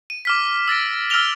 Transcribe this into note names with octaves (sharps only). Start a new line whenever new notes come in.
D#7
D6 F6 B6
E6 A6 A#6 D7
E6 F6 A#6 D7 F7 G7